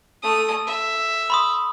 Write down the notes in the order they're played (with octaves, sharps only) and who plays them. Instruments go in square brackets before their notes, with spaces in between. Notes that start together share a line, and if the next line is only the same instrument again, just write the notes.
[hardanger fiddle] A3 D#6
E5
[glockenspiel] B5 C6 D#6